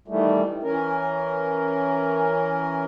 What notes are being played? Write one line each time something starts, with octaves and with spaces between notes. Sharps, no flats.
D#3 E3 G3 A3
E3 C#4 A#4